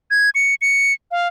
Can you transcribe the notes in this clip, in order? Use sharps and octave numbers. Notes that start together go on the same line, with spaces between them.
G#6
C#7
C#7
F5